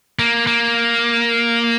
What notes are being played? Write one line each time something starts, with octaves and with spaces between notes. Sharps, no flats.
A#3
A#3